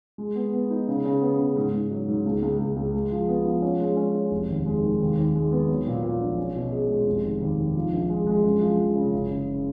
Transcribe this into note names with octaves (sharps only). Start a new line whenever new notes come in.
G#3
B3
B3
D#4
C#3
C#3
B3
C#3
G#2
G#2
F#3
G#2
C#2
C#2
C#2
C#2
G#3
F3
B3
F3
C#4
G#3
C#4
C#4
F1
D#2
G#3
D#3
D#2
D#2
G#3
B3
F#3
A#2
A#2
A#1
C#4
B2
G#4
G#3
F1
D#3
D#2
D#3
F3
A#1
G#3
G#3
F#2
F3
F3
C#3
F#1
C#3